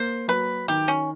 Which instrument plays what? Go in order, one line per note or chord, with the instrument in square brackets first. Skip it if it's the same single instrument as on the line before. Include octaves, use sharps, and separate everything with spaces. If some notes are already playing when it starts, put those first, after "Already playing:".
Already playing: [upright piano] A#3 [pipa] C5
[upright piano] F#3 [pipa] B4
[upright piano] D#3 [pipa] G4
[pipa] C#4